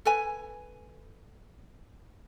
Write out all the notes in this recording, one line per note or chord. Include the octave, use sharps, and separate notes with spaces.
A4 B4 G#5